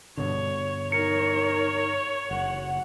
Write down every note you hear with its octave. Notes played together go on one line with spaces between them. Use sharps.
G2 B2 D3 C#5
D#4 A#4 C#5 C#7
F#1 F#5